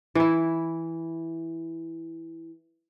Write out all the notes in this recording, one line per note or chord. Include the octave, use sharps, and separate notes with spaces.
E3 E4